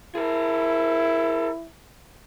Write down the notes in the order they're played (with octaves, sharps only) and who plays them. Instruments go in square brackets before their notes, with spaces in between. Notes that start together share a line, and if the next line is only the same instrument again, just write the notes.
[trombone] E4 [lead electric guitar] G#4 A#4